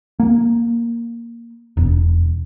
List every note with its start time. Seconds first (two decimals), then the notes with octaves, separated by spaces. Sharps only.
0.20 A#3
1.77 E1